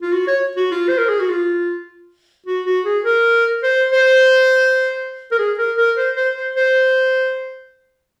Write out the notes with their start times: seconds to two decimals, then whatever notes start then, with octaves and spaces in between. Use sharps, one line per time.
0.02 F4
0.12 F#4
0.27 C#5
0.57 F#4
0.72 F4
0.89 C5
0.98 A#4
1.09 G#4
1.20 F#4
1.29 F4
2.47 F#4
2.66 F#4
2.85 G#4
3.05 A#4
3.63 C5
3.92 C5
5.32 A#4
5.39 G#4
5.58 A#4
5.78 A#4
5.98 C5
6.17 C5
6.36 C5
6.56 C5